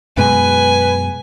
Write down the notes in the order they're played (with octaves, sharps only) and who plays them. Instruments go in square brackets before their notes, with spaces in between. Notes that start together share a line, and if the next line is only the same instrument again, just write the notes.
[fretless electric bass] F#2 B2 G#3 [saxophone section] B4 [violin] G#5